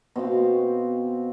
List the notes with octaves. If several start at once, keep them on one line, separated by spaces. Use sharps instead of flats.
B2 C4 F5